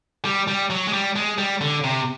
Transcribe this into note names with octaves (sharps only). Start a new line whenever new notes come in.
G3
G3
F#3
G#3
G3
G#3
G3
D3
C3